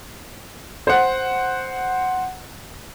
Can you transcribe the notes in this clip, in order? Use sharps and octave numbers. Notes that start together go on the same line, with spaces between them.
C5 F#5